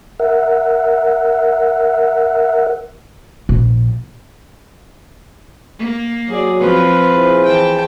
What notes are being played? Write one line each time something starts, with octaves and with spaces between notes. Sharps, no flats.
A#4 E5 F#5
A#1
A#3
F#3 G#4 D5
F3 C4 F4 B4
E4 G#4 C5
E3 G5 A5